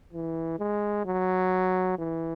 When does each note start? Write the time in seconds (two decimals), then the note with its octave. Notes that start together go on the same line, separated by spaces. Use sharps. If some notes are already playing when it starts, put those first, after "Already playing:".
0.13 E3
0.59 G#3
1.06 F#3
1.99 E3